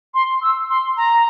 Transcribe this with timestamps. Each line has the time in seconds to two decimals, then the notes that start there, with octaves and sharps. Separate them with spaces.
0.14 C6
0.42 E6
0.69 C6
0.97 A#5